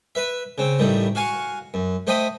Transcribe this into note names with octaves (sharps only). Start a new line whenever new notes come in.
B4 E5
C#3 C4
A1 A2 D#3 G3
F#4 F5 G#5 C#6
F#2
A3 C5 D#5 G5 B5 D#6